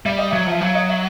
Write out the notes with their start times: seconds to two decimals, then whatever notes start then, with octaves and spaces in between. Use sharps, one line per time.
0.05 G3 E5
0.18 D#5
0.31 F#3 E5
0.47 F3 E5
0.61 F#3 F5
0.75 D#5
0.89 E5